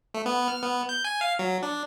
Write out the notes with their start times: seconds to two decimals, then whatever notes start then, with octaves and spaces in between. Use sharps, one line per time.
0.14 A3
0.26 B3
0.48 F6
0.63 B3
0.89 G6
1.05 G#5
1.21 F5
1.39 F#3
1.63 D4